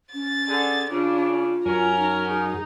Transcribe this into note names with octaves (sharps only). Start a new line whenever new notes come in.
C#4 A6
D3 G#4
C#3 D4 F4
F#2 F#3 C#4 A#4 A#5
D#4
D#4 G#4